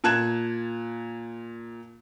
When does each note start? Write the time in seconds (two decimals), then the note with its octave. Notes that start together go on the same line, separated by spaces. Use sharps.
0.04 A#2 A5 F#6 G#6 E7